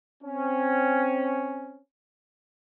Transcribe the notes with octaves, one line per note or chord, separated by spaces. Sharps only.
C4 C#4